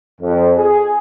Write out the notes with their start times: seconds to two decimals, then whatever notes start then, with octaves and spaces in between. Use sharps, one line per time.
0.21 F2
0.57 G#4